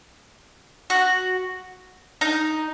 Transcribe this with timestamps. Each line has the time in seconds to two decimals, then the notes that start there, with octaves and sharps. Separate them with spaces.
0.90 F#4
2.21 D#4